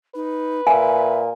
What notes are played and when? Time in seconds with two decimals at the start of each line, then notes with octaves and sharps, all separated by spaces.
0.15 D#4 B4
0.67 A#2 E5 G#5